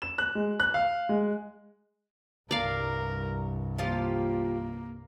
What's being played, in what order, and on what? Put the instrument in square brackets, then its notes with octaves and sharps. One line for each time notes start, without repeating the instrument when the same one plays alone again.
[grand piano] E7
F#6
G#3
F#6
F5
G#3
[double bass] C2 G2 [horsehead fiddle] A#4 [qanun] D5 F5
[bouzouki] F3 F4 G4 [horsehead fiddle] A#3